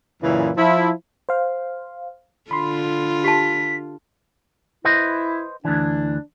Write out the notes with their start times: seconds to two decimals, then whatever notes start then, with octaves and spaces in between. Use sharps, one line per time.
0.23 F#2 A#2 C#3 E3
0.57 F3 E4
1.29 C5 F5
2.51 D3 F4 B5 C6
3.24 G4 A5 B6
4.85 E4 B4 C5 D#5
5.65 D2 E3 D4